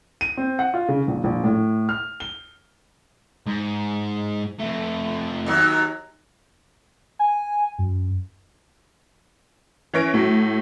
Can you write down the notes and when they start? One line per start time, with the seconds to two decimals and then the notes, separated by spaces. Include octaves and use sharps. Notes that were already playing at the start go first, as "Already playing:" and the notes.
0.21 D#7
0.37 C4
0.59 F#5
0.74 F4
0.88 C#3
1.08 A#1
1.24 A#1
1.44 A2
1.89 F6
2.20 G7
3.47 G#2
4.59 F2 A3
5.47 D#2 F#3
7.19 G#5
7.79 F#2
9.94 E3 C#4 C#5 A#6 D7
10.14 A2 F#3